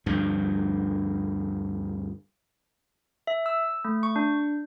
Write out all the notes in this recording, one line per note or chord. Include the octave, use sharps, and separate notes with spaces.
D2 G2 F3
E5
E6
A3
C#6
D4